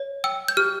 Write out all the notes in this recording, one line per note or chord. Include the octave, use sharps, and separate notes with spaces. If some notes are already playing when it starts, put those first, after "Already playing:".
Already playing: C#5
G5 E6
G6
G4 F6